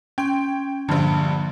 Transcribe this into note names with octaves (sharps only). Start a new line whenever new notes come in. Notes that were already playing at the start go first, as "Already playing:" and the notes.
C#4 G5 C6
A#1 G2 D3 F3 A#3